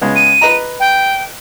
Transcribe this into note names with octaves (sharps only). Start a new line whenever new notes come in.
C#3 G#3 B3
D#7
B4 D#5 A#5
G5